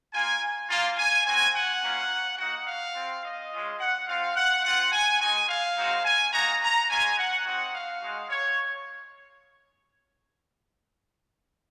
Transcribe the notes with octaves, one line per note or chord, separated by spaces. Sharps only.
A#3 F4 G#5
A#3 F4
G#5
C4 F#4 G#5
F#5
A#3 C#4 F4
A#3 D#4 F#4 F#5
F5
C4 F4
D#5
G#3 C#4 F4
F#5
C4 F4 F5
F#5
C4 F4 F#5
G#5
G#3 D#4 F#4 G#5
F5
G#3 C4 D#4 F#4
G#5
A#3 D#4 F#4 A#5
A#5
G#3 C#4 F4 G#5
F#5
C4 D#4 F#4 F#5
F5
G#3 D#4 F#4
C#5